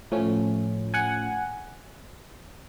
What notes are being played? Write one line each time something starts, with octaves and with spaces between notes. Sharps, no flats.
A2 F3 A3 C#4
F#5 G#5